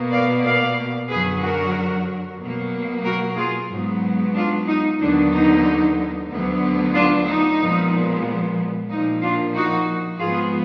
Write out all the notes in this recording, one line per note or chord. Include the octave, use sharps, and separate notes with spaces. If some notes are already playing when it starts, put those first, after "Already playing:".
Already playing: B2 A#3
D5 F5
D5 F5
F#2 D3 F#3 G#4 B4
F#4 A#4
B2 F#3 A#3
F#4 A#4
F4 G#4
G#2 F#3 B3
D4 F4
D#4
D#2 D3 F#3 B3 D4
D#4
D2 D3 F#3 B3
D4 F4
D#4
A#2 F3 G#3 B3
A#2 F3 A#3 D#4
D4 F4
D#4 F#4
G#2 F3 B3 F4 G#4